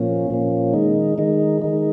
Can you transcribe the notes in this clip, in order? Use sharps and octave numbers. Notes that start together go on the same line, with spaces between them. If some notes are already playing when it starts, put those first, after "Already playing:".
Already playing: A#2 F3 A#3 C#4
A#2 F3 A#3 C#4
D#3 G#3 D#4
D#3 G#3 D#4
D#3 G#3 D#4